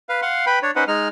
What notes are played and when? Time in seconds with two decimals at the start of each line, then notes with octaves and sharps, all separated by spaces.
0.09 B4 F5
0.22 F5 F#5 C6
0.46 B4 G5 B5
0.62 D4 C#5
0.76 C#4 D#4 B4 C5 F#5
0.88 G#3 D#4 F6